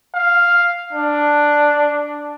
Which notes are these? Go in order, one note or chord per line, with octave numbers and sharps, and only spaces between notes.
F5
D4